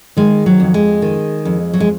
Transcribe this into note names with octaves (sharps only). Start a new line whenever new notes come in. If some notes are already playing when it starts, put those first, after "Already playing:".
D#3 G#3
F#3
F2
G#3
D#3
F2
F#3
G#3